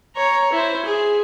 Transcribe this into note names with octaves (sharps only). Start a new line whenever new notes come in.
C#5 A#5
E4 C5
G#4